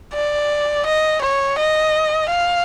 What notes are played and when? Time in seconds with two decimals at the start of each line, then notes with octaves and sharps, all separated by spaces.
0.14 D5
0.85 D#5
1.22 C#5
1.58 D#5
2.30 F5